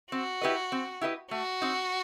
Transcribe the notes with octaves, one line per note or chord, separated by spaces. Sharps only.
C4 F#4
E4 G4 B4 D#5
C4
E4 G4 B4 D#5
A3 F#4
C4 D#4